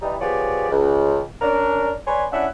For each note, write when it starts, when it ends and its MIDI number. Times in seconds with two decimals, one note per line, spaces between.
0.02 0.16 52
0.02 0.16 55
0.02 0.16 63
0.21 0.70 53
0.21 0.70 59
0.21 0.70 67
0.21 0.70 68
0.21 0.70 73
0.21 0.70 74
0.70 1.21 37
1.41 1.92 61
1.41 1.92 62
1.41 1.92 70
2.07 2.24 71
2.07 2.24 73
2.07 2.24 74
2.07 2.24 80
2.07 2.24 83
2.07 2.24 84
2.32 2.47 61
2.32 2.47 62
2.32 2.47 64
2.32 2.47 76
2.32 2.47 78